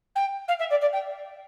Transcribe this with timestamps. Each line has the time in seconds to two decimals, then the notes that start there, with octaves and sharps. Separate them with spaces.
0.15 G5
0.48 F5
0.59 E5
0.70 D5
0.81 D5
0.93 G5